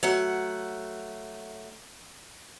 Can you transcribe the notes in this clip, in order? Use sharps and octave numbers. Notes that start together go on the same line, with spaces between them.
F#3 A3 F#5